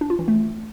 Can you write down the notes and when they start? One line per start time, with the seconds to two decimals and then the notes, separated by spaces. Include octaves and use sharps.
0.01 D4
0.10 F4
0.19 E3
0.28 A3